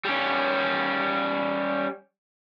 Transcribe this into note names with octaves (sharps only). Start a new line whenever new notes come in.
G3 C#4